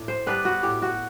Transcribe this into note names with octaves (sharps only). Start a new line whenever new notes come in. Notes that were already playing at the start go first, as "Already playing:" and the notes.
Already playing: A2 D4
C5
G3 B3 D4 B4
F#4
A2 G4
F#4